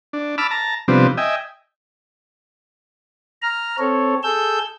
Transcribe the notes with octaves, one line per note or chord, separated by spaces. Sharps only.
D4
A5 B5 D6 E6 F6
A5 A#5
C3 F3 G3 B3 C4 D4
D#5 E5 G5 G#5
A#5 F6
C4 A4 C#5
G#4 A4 E6 G6